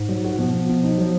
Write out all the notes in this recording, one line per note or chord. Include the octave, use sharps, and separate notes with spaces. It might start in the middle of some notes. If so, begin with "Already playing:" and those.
Already playing: G#2
F#3
F#4
B2 F3
B2
B2
D#4
F#3